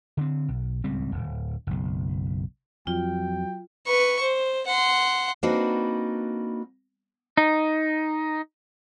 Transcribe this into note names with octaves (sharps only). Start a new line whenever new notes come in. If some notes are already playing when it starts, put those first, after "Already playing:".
D3 C4
B1
D1 C#2 G3 C4
D1
F#1 B1
F2 F#3 F4 G5
B4 C#6
C5
F#5 C6
A#3 C4 D4 D#4 F#4 B4
D#4